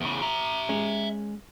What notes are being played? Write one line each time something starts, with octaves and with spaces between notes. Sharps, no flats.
E2 C#3
E5 A#5
G#3 C#4